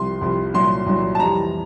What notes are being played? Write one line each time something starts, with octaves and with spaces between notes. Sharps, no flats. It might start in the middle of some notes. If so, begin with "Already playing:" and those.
Already playing: C2 C3 F3 C6
C2 C3 F3
C2 A#2 F#3 C6
C2 A#2 F#3
A5
F2 C3 E3 G3 A#5